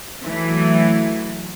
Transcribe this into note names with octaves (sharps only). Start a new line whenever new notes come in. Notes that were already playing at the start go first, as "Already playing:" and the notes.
E3 F#3 A3